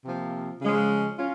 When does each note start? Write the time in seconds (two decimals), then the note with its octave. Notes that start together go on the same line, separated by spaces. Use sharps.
0.05 C3 F3 A#3
0.62 C#3 F3 G#3 C#4
1.19 C#4 F4